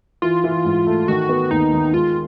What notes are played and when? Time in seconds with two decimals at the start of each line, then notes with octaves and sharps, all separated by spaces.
0.22 E3 F4
0.44 E3
0.65 G#2
0.87 A3
1.08 D#3 F#4
1.29 B3
1.51 D#2 D#4
1.73 D#3
1.94 G#3 F4